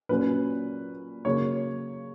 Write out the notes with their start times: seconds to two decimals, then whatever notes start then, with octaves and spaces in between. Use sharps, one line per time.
0.09 A#2 F#3 C#4 B4
1.25 C#3 F#3 A#3 C#5